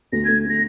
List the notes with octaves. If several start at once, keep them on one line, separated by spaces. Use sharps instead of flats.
D2 A#6
A3 G#6
A3 A#6